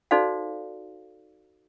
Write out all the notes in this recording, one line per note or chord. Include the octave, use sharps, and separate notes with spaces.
D#4 F#4 A4 C5 D5 F5